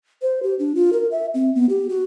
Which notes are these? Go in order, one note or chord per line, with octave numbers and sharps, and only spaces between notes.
C5
G4
D4
F4
A#4
E5
C4
B3
G4
F#4